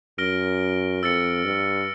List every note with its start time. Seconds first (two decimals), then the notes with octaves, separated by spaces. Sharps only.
0.18 F#2 F6 A#6 D7 G7
1.02 F2 E6 A6 C#7
1.45 G2